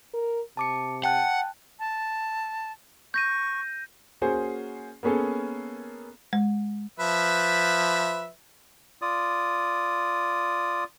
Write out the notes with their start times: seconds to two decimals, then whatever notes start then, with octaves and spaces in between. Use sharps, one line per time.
0.14 A#4
0.57 C3 A5 D6 C#7
1.04 F#5 G5 A5 F#6
1.80 A5
3.14 C#6 G6 A#6 D#7
4.21 A#3 C#4 F#4 G#4 C5
5.03 A#3 B3 C#4 G#4 A4
6.33 G#3
7.00 F3 B4 E5
9.02 F4 D5 D#6